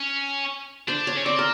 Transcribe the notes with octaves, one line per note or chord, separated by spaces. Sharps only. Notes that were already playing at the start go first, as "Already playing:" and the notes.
Already playing: C#4
D4 C5
C#5
C#4
C4 D5
A#4